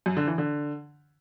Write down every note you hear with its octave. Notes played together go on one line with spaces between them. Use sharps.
F#2
D3
E3
D3